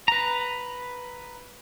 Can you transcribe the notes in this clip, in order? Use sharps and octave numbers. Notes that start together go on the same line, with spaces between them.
B4 A#5